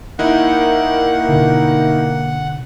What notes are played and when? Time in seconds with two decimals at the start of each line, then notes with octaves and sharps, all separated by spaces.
0.19 D#3 A#3 D#4 E4 F#5
1.29 B2 D3